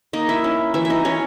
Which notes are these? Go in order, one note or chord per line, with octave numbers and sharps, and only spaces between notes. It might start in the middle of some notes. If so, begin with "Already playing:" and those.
A#3 D#4 D#5
E4 E5
C#4
E3 E4 E5
E5
D#4 D#5
E3 C#4 C#5